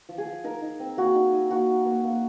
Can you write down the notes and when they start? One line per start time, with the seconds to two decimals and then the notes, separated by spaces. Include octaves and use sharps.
0.09 F3
0.18 G#4
0.26 F3
0.44 D#4 A#4
0.62 D#4
0.80 C4
0.97 A#3 F#4
1.15 D#4
1.33 D#4
1.51 A#3 F#4
1.68 D#4
1.85 A#3
2.04 A#3